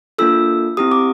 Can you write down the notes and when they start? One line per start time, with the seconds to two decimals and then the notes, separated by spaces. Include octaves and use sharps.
0.18 A#3 D4 F4 A4 E6
0.77 C4 E4 G4 D#6
0.91 D6